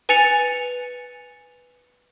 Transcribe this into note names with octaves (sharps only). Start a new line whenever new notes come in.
B4 G#5 A6 C#7 F7